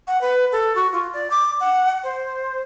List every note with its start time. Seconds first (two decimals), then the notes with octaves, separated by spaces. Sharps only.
0.07 F#5
0.21 B4
0.52 A4
0.76 F#4
0.93 F4
1.13 D5
1.31 D6
1.60 F#5
2.04 C5